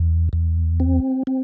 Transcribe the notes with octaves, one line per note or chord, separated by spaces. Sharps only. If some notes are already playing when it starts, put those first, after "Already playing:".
Already playing: E2
E2
C4
C4